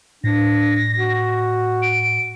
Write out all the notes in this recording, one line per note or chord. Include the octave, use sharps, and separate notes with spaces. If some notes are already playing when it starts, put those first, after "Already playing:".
A2 D4 A#6
F#4
D7